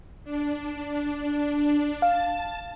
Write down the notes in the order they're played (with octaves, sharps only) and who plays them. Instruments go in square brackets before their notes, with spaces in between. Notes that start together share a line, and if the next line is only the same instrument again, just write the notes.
[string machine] D4
[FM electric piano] F5 [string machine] A5